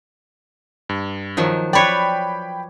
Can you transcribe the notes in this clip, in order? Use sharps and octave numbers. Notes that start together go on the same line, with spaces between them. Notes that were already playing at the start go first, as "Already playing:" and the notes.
G2
D#3 F3 F#3
B4 C#5 D5 G5 B5